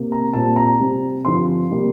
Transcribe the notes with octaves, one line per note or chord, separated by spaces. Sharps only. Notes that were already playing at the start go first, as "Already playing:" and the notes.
Already playing: C3 A#3
A#5
A#2 G3 C4 A5
A#5
C3 G3 C4
G2 D3 F3 C4 C6
C3 G3 A#3